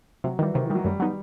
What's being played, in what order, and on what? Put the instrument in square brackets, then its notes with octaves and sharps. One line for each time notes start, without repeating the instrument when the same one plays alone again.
[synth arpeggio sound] C3 [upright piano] F#3
[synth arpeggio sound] D#3 G3 [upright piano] E3
[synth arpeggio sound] C3 [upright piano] D#3
[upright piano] E3
[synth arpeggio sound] D#3 G3 [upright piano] F#3
[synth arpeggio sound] F#2 [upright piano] G3
[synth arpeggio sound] F#3 B3 D#4